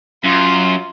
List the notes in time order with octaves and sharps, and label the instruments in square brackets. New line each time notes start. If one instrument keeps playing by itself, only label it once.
[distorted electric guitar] F#2 [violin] F4